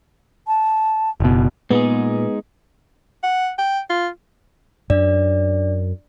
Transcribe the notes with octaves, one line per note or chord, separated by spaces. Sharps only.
A5
F#1 B2
A#2 G#3 B3 D#4 G#4
F#5
G5
F4
F#2 D4 D5